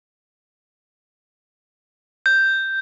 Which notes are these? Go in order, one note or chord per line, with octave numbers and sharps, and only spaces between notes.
G6